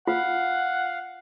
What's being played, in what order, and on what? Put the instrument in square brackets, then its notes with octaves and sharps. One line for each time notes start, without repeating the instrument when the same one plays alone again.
[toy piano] F4 [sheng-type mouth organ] F5 [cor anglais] F#5